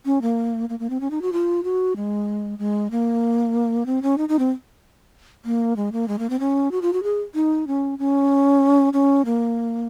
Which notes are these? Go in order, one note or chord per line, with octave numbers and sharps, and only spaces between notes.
C#4
A#3
A#3
A#3
C4
C#4
D#4
F#4
F4
F#4
G#3
G#3
A#3
C4
C#4
D#4
D#4
C4
A#3
G#3
A#3
G#3
A#3
C4
C#4
F#4
F4
F#4
G#4
D#4
C#4
C#4
C#4
A#3